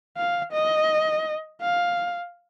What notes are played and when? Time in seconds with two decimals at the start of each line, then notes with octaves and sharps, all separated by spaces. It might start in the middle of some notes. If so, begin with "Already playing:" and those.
0.17 F5
0.53 D#5
1.61 F5